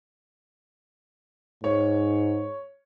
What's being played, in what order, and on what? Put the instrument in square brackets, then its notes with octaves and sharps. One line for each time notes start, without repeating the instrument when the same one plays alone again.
[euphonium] G#2 [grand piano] C#5